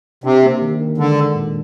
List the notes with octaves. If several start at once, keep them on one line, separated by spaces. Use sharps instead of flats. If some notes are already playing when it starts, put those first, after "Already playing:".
C3 D4
A#3
D#3
D#3
D3 G#3
D4
A#2